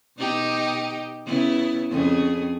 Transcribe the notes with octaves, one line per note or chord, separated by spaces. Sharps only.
B2 D#4 G4
C#3 B3 E4
F2 C#3 G#4